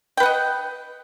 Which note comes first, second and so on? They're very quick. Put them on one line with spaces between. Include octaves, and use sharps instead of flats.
G5 B4 F#5 D#5